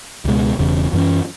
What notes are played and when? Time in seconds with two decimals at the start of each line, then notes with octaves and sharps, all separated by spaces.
0.25 C#2 B2 G#3
0.59 E1 E2 C#3
0.93 F#2 E3 C#4